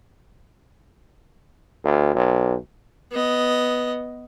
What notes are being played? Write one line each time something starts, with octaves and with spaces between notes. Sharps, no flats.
D2
B1
B3 D#5